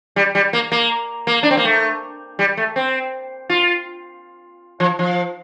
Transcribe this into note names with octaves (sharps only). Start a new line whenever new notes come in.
G3
G3
A#3
A#3
A#3
D4
C4
A#3
A3
G3
A3
C4
F4
F3
F3